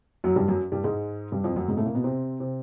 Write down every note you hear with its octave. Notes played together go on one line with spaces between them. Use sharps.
F#2 F#3
G2 G3
F#2 F#3
G2 G3
G#2 G#3
G2 G3
F2 F3
F#2 F#3
G#2 G#3
A2 A3
A#2 A#3
B2 B3
C3 C4
C3 C4